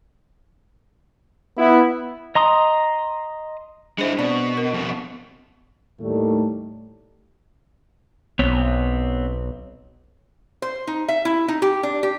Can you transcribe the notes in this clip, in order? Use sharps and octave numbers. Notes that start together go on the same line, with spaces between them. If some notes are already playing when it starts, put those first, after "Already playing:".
B3 E4
D#5 A#5 C6 D#6
G#3 D4 E4 C5
B2 C4 D5 B5
A#4
F2 B2
D#2 A2 D#3 G3 A3
B1 B3 C4 C#5
C5
D#4
E5
E4
D#4
G4
D4
G4